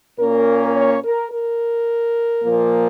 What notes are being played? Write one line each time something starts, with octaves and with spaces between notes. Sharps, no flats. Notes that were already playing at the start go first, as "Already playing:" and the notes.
A#2 A#3 C#4 A#4
C#5
A#4
A#4
A#2 F3 A#3